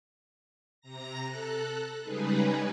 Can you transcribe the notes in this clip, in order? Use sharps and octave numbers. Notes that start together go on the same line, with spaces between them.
C3 A#5 A#6
A4 F#6
C#3 G3 G#3 D#4 G#4 B4